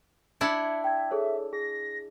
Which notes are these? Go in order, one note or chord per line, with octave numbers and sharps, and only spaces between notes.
D4 E4 E5 G#6 C#7
G5 G#6
G#4 A4 C#5
G#4 A#6